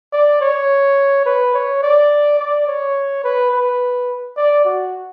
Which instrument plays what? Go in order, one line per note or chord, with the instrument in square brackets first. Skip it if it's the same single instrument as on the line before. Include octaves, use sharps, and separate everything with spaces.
[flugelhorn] D5
C#5
B4
C#5
D5
D5
C#5
B4
B4
D5
F#4